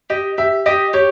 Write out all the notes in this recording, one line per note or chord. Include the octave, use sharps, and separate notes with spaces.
G4 D#5
G4 E5
G4 D#5
G4 C#5